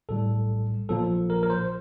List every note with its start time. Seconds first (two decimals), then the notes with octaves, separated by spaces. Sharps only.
0.09 A#1 A2 G3 A4
0.89 A#1 A#2 F3 A#3 A4
1.30 A#4
1.43 A#4
1.50 C5